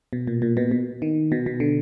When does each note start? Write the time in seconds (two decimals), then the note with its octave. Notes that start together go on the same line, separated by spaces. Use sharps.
0.13 B2
0.27 A#2
0.42 A#2
0.57 B2
0.71 B2
1.02 D#3
1.32 B2
1.46 B2
1.60 D3